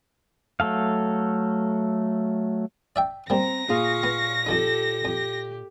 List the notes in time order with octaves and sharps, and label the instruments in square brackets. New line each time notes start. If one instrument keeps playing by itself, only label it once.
[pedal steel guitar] F#3 A3 A4 F5
[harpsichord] D5 E5 G5
[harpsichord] G3 A#3 [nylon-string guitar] C4 [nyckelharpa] A#5 [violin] A#6
[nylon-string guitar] A#2 F4 G#4 [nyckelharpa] F5 C#6
[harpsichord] B3
[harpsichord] F2 F3 D#4 [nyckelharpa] G4 A4
[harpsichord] F2 [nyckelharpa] G4